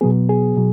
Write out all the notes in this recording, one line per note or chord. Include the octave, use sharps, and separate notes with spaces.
B2 F#3 B3 G#4
G#4
B2 F#3